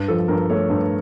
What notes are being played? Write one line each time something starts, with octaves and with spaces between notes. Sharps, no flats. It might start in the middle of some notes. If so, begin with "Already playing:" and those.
Already playing: G2
F3 A4
G2 A#4
A3 C#5
G2